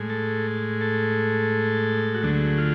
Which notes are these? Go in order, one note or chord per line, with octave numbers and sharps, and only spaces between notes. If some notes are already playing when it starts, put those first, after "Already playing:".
Already playing: A2 G#3
A4
A4
F#4
D2 D3 F#3 A3 G#4
F4